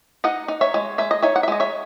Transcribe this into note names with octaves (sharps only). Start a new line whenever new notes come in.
D#4 D#5 F#5
D#4
C#5 E5
G#3
G#3 E5
D#5
D#4 C#5 E5
F#5
E5
G#3 D#5
C#5 E5